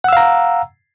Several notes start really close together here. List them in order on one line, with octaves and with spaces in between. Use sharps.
F#5 E6 F5 A#5